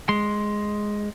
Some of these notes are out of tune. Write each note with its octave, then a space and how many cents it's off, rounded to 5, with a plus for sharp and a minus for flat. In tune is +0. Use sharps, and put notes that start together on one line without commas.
G#3 +0 C6 +0